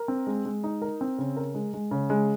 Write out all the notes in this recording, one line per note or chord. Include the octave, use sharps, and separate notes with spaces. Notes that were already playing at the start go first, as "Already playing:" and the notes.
Already playing: A#4
C4
G#3
G#3
D#4
A#4
C4
C#3
A#4
G#3
G#3
C#3
G#3